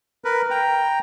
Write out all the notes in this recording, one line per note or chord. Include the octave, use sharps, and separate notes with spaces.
A#4 B4
G5 A#5